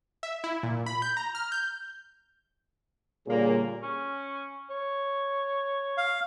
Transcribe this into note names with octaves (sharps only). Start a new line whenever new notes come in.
E5
E4
A#2
B5
G6
A#5
F6
G6
A#2 D3 G3 A#3 G#4 C#5
C#4
C#5
F5